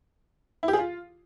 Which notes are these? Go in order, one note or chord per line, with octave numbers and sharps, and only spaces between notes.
E4
G4
G#4
F4